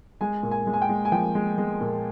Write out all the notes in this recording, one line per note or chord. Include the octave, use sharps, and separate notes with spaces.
G#3 G#5
A#2
G#5
G#3
G#5
G5
G#3
G#5
F3 G5
G#3
G#3
A#2